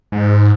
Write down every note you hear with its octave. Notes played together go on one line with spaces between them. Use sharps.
G#2